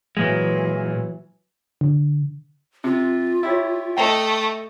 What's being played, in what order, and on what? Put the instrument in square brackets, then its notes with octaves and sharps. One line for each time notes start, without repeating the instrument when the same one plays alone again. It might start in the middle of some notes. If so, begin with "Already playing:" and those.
[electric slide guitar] A#2 G#3 [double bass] E3 F#3
[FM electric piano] D3
[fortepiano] C3 [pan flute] F4
[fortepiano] E4 G4 C#5
[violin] A3 [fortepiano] D#5 G5